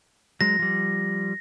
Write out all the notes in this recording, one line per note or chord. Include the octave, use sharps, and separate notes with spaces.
F#3 G#3 A#6
F3 G3